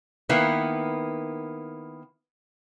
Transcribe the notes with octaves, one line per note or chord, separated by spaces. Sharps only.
D#3 A#3 B3 E4 B4